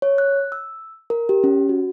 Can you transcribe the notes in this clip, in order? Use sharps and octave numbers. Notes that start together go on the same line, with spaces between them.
C#5
F#6
E6
A#4
G4
C#4
F#4